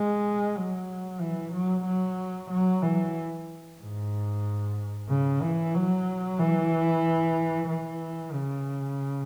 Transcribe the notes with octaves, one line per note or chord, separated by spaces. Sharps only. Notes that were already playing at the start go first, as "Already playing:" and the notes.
Already playing: G#3
F#3
E3
F#3
F#3
F#3
E3
G#2
C#3
E3
F#3
E3
E3
C#3